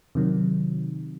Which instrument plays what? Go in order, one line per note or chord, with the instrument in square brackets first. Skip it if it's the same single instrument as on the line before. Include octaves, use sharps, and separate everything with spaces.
[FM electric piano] C3 D#3 F#3